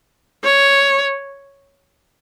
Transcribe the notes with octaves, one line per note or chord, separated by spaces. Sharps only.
C#5